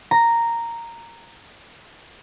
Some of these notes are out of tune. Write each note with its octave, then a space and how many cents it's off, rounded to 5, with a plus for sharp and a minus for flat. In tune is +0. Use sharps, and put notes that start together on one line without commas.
A#5 -5